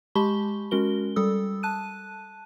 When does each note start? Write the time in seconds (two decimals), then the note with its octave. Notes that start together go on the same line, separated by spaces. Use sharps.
0.15 G#3 G4 A5 B5 C#6 G7
0.71 G#3 C#4 F#4 A#4 G7
1.16 G3 A4 D#6 E6
1.63 A5 F#6 D#7